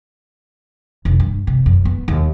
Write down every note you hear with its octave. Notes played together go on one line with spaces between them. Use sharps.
F1
G2
C3
F#2
B3
D#2